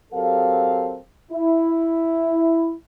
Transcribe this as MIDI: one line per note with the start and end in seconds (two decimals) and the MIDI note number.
0.13 0.96 54
0.13 0.96 60
0.13 0.96 67
0.13 0.96 69
0.13 0.96 70
0.13 0.96 77
1.32 2.74 64